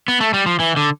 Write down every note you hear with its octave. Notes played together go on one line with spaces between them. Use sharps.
B3
A3
G3
F3
E3
D3